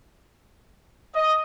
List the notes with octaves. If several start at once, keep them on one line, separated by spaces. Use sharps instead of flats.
D#5